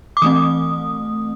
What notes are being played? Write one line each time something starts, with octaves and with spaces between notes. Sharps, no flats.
D6
E3 A3 C4 D#6